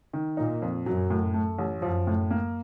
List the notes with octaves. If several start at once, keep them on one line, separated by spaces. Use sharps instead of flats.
D#3
A#2 D#4
F2
F#2 F#3
A2
A3
A1
F#2 F3
A2
A#3